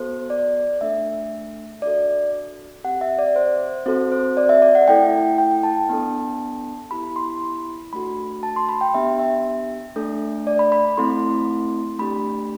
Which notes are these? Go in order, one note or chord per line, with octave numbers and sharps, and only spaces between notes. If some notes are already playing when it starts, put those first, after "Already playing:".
Already playing: B3 F#4 A4 C5
D5
A3 D4 A4 E5
D4 F#4 A4 D5
C4 G4 F#5
E5
D5
C5
C4 F#4 A4 C5
C5
D5
E5
D5
F#5
A3 E4 A4 G5
G5
A5
B3 D4 A4
B3 E4 G4 B5
C6
B5
A3 D4 F#4 A4 B5
A5
C6
B5
G5
B3 D4 G4 E5
E5
A3 D4 A4
D5
B5
B5
A3 C4 E4 A4 C6
A3 D4 G4 B5